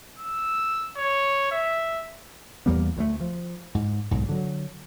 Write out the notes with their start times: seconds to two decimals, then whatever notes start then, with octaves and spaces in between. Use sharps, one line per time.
0.18 E6
0.97 C#5
1.52 E5
2.66 E2 G3 A#3 B3
2.97 D2 F#3 A3
3.20 F3
3.75 G#2
4.11 B1 G#2
4.29 D3 F#3